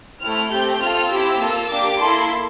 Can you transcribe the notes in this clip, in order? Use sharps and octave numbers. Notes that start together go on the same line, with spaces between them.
A3 C4 E4 F6
A3 C4 G4 G6
C4 F4 A4 F6
C4 E4 G4 E6
A#3 F4 A4
A#3 D4 G4 D6
A#3 E4 A4 C6